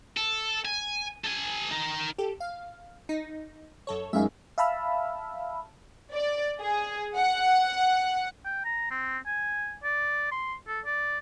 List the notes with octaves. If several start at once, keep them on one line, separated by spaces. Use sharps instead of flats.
A4
G#5
A4 G#5
D#4 A#4
G4 A4
F5
D#4
F#2 A4 C#5
F#2 G#3 D#4 E5 F5
E5 F5 A5 B5 E6 F6
D5
G#4
F#5
G5
A#5
C4
G#5
D5
C6
A4
D5